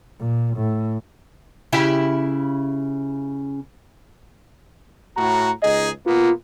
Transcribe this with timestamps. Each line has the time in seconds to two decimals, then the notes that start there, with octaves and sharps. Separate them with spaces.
0.19 A#2
0.56 A2
1.73 C#3 E4 G4
5.16 A2 F#4 A#5
5.62 C#2 D#4 G#4 D#5
6.06 B2 A#3 B3 F4